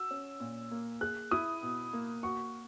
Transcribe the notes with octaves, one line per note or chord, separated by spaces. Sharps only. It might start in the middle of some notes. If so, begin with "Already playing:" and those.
Already playing: F#4 E6
C#4
A#2
A#3
G#4 F#6
E4 D#6
B2
A#3
F#4 C#6